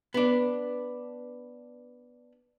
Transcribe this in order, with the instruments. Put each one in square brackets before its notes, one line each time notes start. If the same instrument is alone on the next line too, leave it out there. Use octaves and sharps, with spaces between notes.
[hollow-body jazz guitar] B3 D4